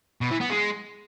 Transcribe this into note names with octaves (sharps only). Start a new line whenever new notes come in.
B2
E3
B3
G#3